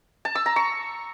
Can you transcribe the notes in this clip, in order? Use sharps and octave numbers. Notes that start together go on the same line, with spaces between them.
A5
E6
A#5
C#6